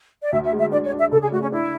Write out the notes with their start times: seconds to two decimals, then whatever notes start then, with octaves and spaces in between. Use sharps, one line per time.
0.22 D5
0.32 D2 E5
0.45 E5
0.52 G#3
0.58 E5
0.72 D4 D5
0.86 C#5
0.92 D4
0.99 E5
1.12 C#3 A4
1.21 G#4
1.32 A3 F#4
1.41 C#4
1.52 D4 E4